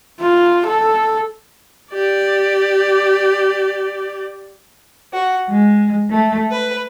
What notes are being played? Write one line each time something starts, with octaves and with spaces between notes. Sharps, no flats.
F4
A4
G4 D5
F#4
G#3
A3
B4